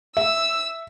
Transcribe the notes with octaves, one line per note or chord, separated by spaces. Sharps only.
E5 E6